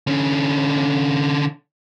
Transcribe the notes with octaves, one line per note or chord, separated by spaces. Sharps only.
D3 C#4